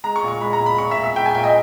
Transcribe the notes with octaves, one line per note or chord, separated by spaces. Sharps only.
G#3 A#5
C#6
A#2
C#6
G#3 B5
A#5
A#2
B5
A#2 C#6
E5
A#2
E5
G#3 G5
G#5
A#2 G5
D#5